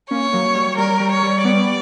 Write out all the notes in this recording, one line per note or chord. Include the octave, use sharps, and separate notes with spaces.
A#3 C#4 C#5
F#3 A#3
G3
G3 A#4
G3
C#5
G3
G3 B3 D5